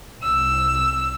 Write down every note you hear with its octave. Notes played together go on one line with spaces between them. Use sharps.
C2 E6